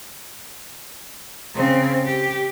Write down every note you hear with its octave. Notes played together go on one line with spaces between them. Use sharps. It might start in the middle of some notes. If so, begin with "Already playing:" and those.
C#3 C4
G4